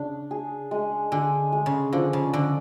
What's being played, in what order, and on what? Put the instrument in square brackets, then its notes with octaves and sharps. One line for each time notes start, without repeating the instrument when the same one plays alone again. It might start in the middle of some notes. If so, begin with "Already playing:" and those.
Already playing: [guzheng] C#3 [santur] D4
[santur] G#4
G#3
[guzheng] D3 [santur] G#4
[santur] G#3
[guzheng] C#3
[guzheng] D3 [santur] F3
[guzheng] C#3
[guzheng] D3 [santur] F3